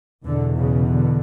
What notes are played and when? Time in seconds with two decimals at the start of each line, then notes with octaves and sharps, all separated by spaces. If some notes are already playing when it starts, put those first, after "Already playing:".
0.25 E2 B2 D3
0.57 C#3
0.88 D3